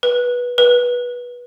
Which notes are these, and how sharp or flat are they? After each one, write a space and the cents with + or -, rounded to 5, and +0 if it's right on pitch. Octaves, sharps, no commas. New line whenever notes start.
B4 -15
B4 -20